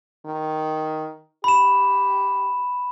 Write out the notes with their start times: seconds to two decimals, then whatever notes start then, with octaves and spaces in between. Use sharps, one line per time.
0.26 D#3
1.44 G4 B5 E7